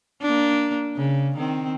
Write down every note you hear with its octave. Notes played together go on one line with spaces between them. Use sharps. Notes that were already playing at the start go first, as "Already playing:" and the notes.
A#3 D4
C#3
D#3 C4